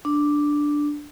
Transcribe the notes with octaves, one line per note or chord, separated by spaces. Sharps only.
D4